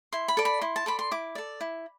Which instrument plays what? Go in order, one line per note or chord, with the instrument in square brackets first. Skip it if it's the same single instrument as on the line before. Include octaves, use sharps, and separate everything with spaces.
[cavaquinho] E4 C6
B5
A4 D5
B5
E4 C6
A5
A4 D5 B5
C6
E4 D6
A4 D5
E4